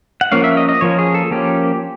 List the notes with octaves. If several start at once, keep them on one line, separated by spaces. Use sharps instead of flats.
F#5
F3 A#3 C#4 F5
E5
D#5
D#5
F3 A#3 C#4 C#5
G#4
A4
F3 A#3 C#4 G4